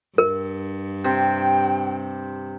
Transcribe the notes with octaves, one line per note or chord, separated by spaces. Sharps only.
G2 A#4
C3 G5